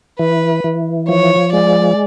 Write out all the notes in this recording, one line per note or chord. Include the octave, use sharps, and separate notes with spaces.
E3 B4
E3
F3 C#5
G#3 D5